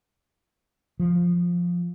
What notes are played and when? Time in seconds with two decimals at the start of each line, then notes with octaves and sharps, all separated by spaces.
1.00 F3